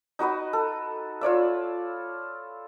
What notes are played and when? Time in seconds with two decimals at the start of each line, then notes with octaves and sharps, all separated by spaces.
0.19 D#4 F#4 B4 D#5
0.53 A4
1.21 F4 C#5 D5 E5